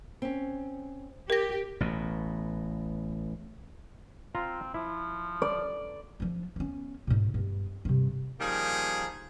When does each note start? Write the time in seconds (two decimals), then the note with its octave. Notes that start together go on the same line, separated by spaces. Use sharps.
0.22 C4 C#4
1.30 G4 A#4 A#6
1.80 A1 B2
4.35 C4 F4 A#5
4.74 F3 E4
5.42 D5
6.20 F3 D4
6.56 B3 C#4
7.07 G#2 B2
7.34 G2 B3
7.85 G2 C3
8.40 D#3 F3 G3 A#3 G#4